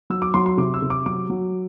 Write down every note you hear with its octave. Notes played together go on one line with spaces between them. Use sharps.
F#3 E6
D6
F#3 C6
C6
C3 D6
E6
C3
D6
F#3 D6
F#3